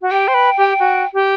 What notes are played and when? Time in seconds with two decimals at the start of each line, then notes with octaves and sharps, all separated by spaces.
0.02 F#4
0.11 G4 G5
0.28 C5
0.34 B4
0.57 G4
0.79 F#4
1.14 G4